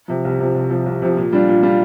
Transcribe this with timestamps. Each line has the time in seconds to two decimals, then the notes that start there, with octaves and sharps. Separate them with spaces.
0.08 C3 F3
0.25 C2
0.40 C3 F3
0.54 C2
0.70 C3 F3
0.86 C2
1.02 C3 F3
1.17 A#2
1.33 G3 D4 F4
1.48 A#2
1.63 G3 D4 F4